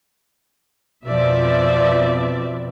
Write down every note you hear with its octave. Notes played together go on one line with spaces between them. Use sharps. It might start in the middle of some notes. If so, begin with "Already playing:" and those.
F2 B2 F3 D5 E5